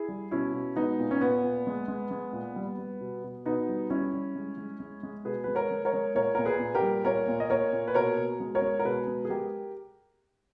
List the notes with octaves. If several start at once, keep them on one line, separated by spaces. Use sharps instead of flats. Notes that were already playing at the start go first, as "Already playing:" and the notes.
Already playing: E4 G#4
G3
B2 C#4 E4
B2
G#3 B3 D#4
A#2
C#4
A#2 B3
A#2
G#3
G#3
G#3
A#2
G3
G3
B2
B2
B2 B3 D#4
G3
G3 C#4 E4
G3
G#3
G#3
G#3
G#3
B2 G#4 B4
G#3 B4
A#4 C#5
G#3
A#4 C#5
G#3
A#2 A#4 C#5
A#2 A#4
G#4 B4
A#2
G4 A#4
G3
A#2 A#4 C#5
A#2
D#5
A#2 A#4 C#5
A#2
B4
B2 A#4 C#5
B2
G#3
A#4 C#5
G#3
A#4
B2 G#4 B4
G#3
G#4
G#3 G4 A#4